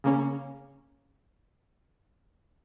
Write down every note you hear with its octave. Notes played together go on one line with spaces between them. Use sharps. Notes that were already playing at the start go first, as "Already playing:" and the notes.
C#3 A#3 C#4